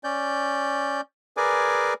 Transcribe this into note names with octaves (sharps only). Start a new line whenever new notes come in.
C#4 D5 G6
G#4 A#4 B4 D5 G#5 D6